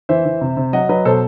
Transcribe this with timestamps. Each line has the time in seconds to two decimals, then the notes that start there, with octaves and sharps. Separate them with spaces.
0.09 E3 C5 E5
0.25 E3
0.41 C3
0.57 C3
0.73 F#3 D#5 F#5
0.89 F#3 B4 D#5
1.05 B2 A4 C5